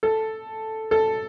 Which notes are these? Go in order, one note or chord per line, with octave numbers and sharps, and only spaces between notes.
A4
A4